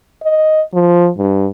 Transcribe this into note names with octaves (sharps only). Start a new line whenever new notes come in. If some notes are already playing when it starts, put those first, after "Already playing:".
D#5
F3
G2